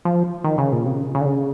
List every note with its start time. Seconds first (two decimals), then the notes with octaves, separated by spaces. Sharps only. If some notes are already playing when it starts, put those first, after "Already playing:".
0.05 F3
0.44 D#3
0.58 C#3
0.72 A#2
0.85 C3
0.95 C#3
1.15 C#3
1.21 D3
1.26 C#3